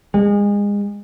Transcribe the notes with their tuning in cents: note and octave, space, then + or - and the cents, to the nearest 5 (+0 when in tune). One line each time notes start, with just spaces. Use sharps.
G#3 -30